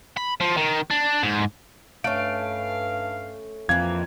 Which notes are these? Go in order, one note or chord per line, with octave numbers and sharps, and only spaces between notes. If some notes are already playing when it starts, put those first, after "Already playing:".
B5
F3
D#3
D4
G#2
G2 A3 C#4 F5 D7
F2 E3 A#3 G#6